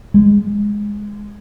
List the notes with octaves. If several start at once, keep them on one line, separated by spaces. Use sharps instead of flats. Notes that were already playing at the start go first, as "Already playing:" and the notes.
G#3